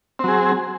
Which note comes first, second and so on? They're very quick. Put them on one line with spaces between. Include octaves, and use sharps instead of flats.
C4 F#3 G#4